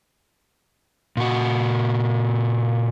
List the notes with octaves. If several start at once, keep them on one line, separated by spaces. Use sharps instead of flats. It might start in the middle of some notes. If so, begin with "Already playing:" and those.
A#2 F#4